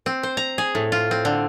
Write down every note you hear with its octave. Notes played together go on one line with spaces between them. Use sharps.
C4
C5
A#5
G#4
A2
F4
C4
D3